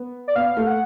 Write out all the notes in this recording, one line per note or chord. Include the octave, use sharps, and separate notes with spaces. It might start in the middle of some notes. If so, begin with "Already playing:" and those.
Already playing: B3
D5
B3 F5
A3
F#5